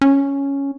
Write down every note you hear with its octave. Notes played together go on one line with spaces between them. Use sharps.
C#4